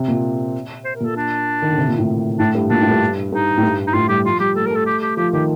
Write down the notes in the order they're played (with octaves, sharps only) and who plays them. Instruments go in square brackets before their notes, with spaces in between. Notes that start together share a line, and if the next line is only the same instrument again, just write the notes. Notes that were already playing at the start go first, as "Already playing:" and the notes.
Already playing: [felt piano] C3
A#2
[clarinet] C5
A#4
[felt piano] A#2 [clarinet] A4
[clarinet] D4
[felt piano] D#3
D3
C3
A#2
A2
[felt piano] A2 [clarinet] D4
[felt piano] G2
[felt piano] A#2 [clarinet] D4
[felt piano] A2
G2
[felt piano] G2 [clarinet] D#4
[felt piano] A2
G2
[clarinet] D#4
[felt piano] A2 [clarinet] F4
[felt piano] G3 [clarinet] G4
[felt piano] F3 [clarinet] F4
[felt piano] G3 [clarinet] G4
[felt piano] A3 [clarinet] A4
[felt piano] G3
[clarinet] A#4
[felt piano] A3
[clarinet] A4
G4
G4
[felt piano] F3 [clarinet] G4
[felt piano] D#3 [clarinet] G4